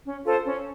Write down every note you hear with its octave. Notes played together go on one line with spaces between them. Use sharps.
C#4
F4 A4 C5
C#4